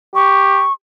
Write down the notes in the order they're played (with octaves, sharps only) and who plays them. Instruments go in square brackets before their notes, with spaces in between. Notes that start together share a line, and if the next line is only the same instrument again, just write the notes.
[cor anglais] G4 [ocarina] C#6